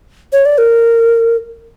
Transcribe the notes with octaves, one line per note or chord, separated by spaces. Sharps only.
C#5
D5
A#4